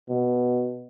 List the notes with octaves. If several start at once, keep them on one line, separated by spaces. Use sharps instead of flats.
B2